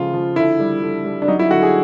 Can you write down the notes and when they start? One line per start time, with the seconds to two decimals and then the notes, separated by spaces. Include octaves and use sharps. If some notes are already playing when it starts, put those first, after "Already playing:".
Already playing: C#3 F3 G#3 F4
0.13 F3
0.36 D3 E4
0.60 G3
0.82 D3
1.05 G3
1.22 D4
1.28 F#3 D#4
1.39 E4
1.51 D3 F#4
1.63 G#4